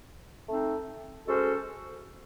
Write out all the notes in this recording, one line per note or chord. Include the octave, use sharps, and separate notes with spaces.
A3 C4 D#4
G#3 C#4 F#4 A4 C5